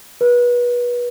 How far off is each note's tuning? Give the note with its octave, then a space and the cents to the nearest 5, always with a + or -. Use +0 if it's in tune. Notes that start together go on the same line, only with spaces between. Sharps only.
B4 -30